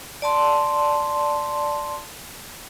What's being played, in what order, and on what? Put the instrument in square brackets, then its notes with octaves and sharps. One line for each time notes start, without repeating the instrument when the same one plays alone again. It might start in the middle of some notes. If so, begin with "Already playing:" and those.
[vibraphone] D5 A5 C6